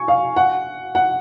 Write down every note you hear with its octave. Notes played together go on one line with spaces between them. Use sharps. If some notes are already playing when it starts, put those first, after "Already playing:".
Already playing: G#5 C#6
F5
F#5
F#5